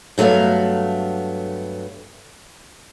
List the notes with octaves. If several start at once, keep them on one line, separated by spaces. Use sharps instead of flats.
G2 F#3 A3 B3 F5